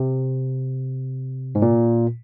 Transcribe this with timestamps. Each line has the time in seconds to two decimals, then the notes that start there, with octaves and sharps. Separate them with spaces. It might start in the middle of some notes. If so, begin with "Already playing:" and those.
Already playing: C3
1.55 G#2
1.62 A#2